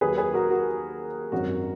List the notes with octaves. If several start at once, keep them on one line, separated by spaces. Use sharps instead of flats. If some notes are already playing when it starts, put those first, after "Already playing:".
D#2 D#3 F#3 G#4 B4
G#4 B4
F#4 A#4
F#4
G#1 F#2 D#3 F#3 F#4 A#4